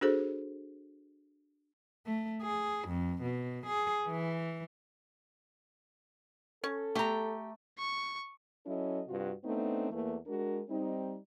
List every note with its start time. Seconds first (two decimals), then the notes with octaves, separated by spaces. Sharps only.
0.01 D4 F#4 G#4 A4 C5
2.06 A3
2.42 G#4
2.88 F2
3.22 B2
3.66 G#4
4.08 E3
6.64 C#4 A4
6.95 A3 G4 A#5
7.78 C#6
8.65 F#3 C#4 E4 A4 D#5
9.08 G2 C3 F4 F#4
9.45 A3 B3 C4 D4 D#4
9.90 E2 E3 A3 A#3
10.27 G#3 D4 F#4 A#4
10.68 G3 C4 D#4